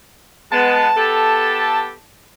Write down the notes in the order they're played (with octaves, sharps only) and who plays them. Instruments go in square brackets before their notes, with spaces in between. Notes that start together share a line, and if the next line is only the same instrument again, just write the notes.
[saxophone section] G#3 B3 [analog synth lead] A5
[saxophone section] B3 G4 A4